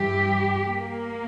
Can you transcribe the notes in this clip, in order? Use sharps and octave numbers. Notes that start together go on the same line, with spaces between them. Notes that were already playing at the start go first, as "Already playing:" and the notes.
Already playing: G2 E3 G4
A#3